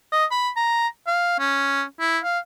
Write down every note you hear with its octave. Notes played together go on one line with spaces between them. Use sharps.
D#5
B5
A#5
F5
C#4
E4
F5